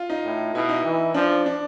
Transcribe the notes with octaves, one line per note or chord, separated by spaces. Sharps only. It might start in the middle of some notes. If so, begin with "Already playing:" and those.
Already playing: F4
D#4
A2
B2 E4
D#4
E3
F3 D4
D4